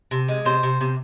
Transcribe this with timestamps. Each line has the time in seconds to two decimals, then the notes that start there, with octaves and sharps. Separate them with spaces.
0.11 C3
0.28 G#3
0.45 C3 C5
0.63 C3
0.81 C3